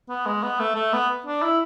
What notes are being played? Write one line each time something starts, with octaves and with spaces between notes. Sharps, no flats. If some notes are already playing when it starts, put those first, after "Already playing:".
B3
G#3
B3
A3
A3
B3
D4
E4